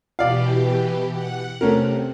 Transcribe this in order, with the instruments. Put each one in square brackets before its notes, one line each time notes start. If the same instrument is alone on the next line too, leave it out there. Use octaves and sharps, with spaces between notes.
[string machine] B2 E3 G4 [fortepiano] D5 F5
[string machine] F#5
[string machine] C3 [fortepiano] A3 C#4 A#4